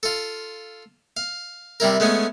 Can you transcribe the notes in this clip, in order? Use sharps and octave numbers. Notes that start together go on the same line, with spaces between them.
F4 A4
F5
C3 G3 E4 A#4
G#3 A3 B3 C#4